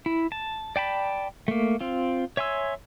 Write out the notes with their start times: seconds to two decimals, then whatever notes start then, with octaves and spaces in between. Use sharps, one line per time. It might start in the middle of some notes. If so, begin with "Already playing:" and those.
0.06 E4
0.32 A5
0.76 D5 G5 A5 B5
1.48 A3 A#3
1.81 C4 F4
2.37 C#5 E5 G#5 C6 E6